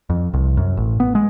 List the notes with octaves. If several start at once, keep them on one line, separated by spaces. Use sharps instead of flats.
F2
C2
F#2
A1
B3
G#3